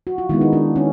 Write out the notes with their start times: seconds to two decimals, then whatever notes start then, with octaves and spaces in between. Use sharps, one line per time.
0.07 F#4
0.18 F4
0.29 D#3 G#3 B3 E4
0.41 D#4
0.53 D4
0.76 C#4